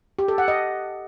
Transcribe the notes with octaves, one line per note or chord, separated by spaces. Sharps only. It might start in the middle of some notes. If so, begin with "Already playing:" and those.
G4
A4
F#5
D#5